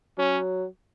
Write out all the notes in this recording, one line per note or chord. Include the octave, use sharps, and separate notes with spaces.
F#3 C#4